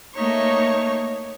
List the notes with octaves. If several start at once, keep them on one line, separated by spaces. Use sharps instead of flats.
A3 A#3 D#4 C#5 C#6